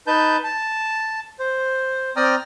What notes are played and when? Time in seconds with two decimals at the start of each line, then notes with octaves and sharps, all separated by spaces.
0.07 D#4 B4 A5 G6
0.44 A5
1.39 C5
2.16 C4 D5 G5 A#5 D#6 F6